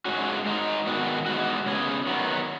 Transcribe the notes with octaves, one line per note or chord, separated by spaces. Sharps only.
G#2 G#3 C#4 F#4
G#2 D#3 G#3 D#4
G#2 D#3 B3 F#4
G#2 G#3 B3 D#4 F#4
C#3 B3 G#4
D#3 F#3 B3